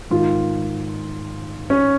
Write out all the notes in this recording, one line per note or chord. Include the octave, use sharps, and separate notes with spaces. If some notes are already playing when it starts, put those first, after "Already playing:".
G#2 D#3 F4
C#4